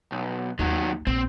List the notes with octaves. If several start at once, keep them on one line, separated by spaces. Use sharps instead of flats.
B1
D#2 D#3 F#3 D#4
A#1 C4